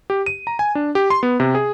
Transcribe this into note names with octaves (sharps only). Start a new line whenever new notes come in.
G4
D#7
A#5
G#5
D4
G4
C6
B3
C3
G#4